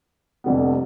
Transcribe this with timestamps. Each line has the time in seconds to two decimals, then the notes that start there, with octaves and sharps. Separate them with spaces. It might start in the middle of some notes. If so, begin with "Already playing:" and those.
0.44 F1 F2 D3 G3 B3